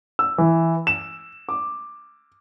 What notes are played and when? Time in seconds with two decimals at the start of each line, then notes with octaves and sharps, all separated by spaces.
0.19 E6
0.38 E3
0.87 E7
1.49 D6